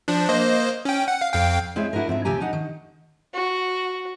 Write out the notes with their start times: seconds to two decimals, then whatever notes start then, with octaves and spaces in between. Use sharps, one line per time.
0.08 F3 D4
0.29 A#3 C5 D#5
0.85 C#4 G5
1.08 F#5
1.21 F5
1.33 F2 F5 G5
1.76 G#3 C4 E4 G#4 C#5 E5
1.93 D4 E4 F#4 G#4 A#4
2.08 G#2 C4 F4 E5
2.25 D#2 C3 F3 G4 G#5 A#5
2.40 D4 D#4 D#5 F#5
2.53 D#3
3.34 F#4